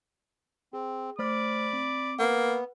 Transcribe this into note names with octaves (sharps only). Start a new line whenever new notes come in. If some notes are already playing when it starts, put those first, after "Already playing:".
C4 G#4
A3 C5 D5 B5 D6 F6
C4
A#3 B3 B4 F#5